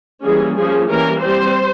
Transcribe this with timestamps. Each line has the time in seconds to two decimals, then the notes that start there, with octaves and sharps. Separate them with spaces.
0.23 E3 G3 A#3 C#4 G#4
0.56 F3 A#3 C#4 G#4
0.88 E3 G3 A#3 C#4 A#4
1.21 G3 C4 C5